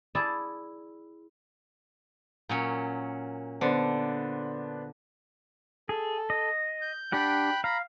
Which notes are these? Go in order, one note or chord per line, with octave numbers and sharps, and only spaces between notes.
E4 G#4 D5 A5
A#2 F#3 C#4
D3 B3 D4 C5
G#4 A4
D#5
G6
D4 G4 F#5 G5 B5 F#6
F5 A#5 B5